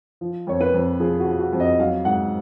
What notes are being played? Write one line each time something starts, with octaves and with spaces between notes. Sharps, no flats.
F3
F2 C#5
B4
F2
F3 G#4
F#4
F3
F#4
F2
D#5
F#3 F5
G#2 F#5